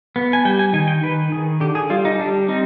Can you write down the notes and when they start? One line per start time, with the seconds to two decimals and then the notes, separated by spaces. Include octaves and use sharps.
0.16 B3
0.33 G#5
0.45 G3 G5
0.59 G#5
0.73 D#3 G#5
0.88 G5
1.03 D#3 B4
1.32 D#3 G#4
1.60 D3 G4
1.75 G#4
1.90 G3 F4
2.05 D#4
2.19 G3 D4
2.48 C4 D#4